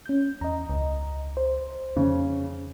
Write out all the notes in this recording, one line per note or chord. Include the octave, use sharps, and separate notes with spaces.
C#4 G6
E2 D#5 A#5
C#2
C5
F2 C#3